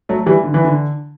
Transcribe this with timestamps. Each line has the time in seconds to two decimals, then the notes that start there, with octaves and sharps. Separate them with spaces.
0.09 F#3 A3
0.26 E3 G3
0.44 D3
0.54 E3
0.65 D3